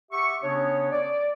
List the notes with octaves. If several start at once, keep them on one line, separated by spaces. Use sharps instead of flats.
G4 E5 F#5 C#6
C#3 B3 C#4 D4 C#5
D5